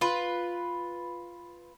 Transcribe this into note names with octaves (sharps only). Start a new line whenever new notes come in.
F4 B4